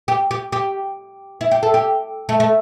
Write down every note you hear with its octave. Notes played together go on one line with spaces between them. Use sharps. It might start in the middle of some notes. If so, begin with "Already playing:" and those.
G4
G4
G4
E4
G4
A4
G4
A3
A3